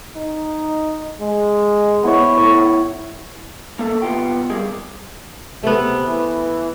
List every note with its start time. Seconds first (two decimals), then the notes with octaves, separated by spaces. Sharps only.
0.16 D#4
1.21 G#3
2.03 B3 E4 C#5
2.37 A2 C#5
3.79 A#3 A4
4.02 C2 B3 F4 G5
4.50 G3 C4 G#4 A#4
5.63 C3 A3 B3
6.07 E3